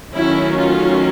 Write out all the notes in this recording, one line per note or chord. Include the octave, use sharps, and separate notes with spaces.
D#3 F#3 A3 C#4 E4
F4